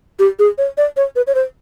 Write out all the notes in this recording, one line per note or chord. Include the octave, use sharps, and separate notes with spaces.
G4
G#4
C#5
D5
C#5
B4
C#5
C5